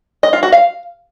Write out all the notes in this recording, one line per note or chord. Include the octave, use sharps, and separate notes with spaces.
D#5
F4
F#4
F5